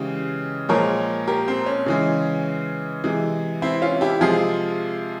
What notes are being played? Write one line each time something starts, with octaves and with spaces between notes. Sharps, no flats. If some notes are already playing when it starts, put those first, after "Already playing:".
Already playing: C#3 E3 G#3 G4
A#2 F3 G#3 A#4 C#5
G4 A#4
C4
C#4
C#3 E3 G#3
C3 E3 G#3
C4 E4
C#4 F4
E4 G4
C3 F3 G#3 F4 G#4